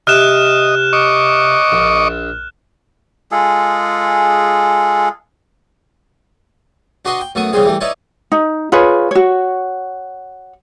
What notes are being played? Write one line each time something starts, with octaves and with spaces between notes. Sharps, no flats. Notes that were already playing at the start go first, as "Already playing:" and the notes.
C3 D#5 F6 F#6 E7
D#5 C#6 D6
A#1
G#3 F4 G#4 A4
D4 F#4 B4 D#5 C6 C#6
G5
F#2 A3 B3 C#6 D#6
C#3 E3 G3 B3 C4 G#4
E3 G3 A3
D#4 E4 B4 C#5 D5
D#4
F4 G#4 B4 C#5
F#4 C#5